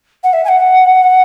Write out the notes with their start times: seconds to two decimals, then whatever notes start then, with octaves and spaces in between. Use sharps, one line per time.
0.24 F#5
0.33 E5
0.45 G#5
0.48 F#5